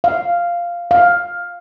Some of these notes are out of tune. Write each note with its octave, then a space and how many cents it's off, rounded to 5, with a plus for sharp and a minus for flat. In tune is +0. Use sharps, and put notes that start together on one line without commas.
F5 -5
F5 +10